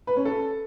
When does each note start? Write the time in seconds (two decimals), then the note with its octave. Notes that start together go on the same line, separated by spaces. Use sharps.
0.07 B4
0.16 C#4
0.25 A4